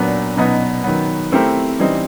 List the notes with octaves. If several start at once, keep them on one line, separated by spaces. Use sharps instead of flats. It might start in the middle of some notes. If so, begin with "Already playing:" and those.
Already playing: A#2 F#3 B3 D4
B2 F#3 B3 D#4
D#3 F#3 B3
A3 C4 E4 G4 A#4
E3 G3 C4 D#4